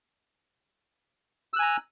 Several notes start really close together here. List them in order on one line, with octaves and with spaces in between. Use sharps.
E6 F#6 G#5 A#5